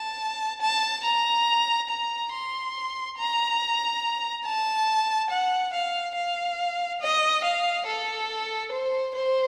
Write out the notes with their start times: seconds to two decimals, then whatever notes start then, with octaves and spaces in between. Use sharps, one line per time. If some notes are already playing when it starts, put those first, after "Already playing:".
Already playing: A5
0.61 A5
1.04 A#5
1.89 A#5
2.32 C6
3.17 A#5
4.45 A5
5.30 F#5
5.73 F5
6.15 F5
7.01 D#5
7.44 F5
7.86 A4
8.72 C5
9.15 C5